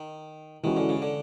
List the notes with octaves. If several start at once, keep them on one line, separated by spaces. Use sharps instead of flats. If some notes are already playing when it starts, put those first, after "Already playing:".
Already playing: D#3
D#3 E3 G#3 C#4 F#4
D3
C#3
D3